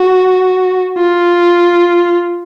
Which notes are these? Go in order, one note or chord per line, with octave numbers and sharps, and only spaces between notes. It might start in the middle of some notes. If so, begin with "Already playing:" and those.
Already playing: F#4
F4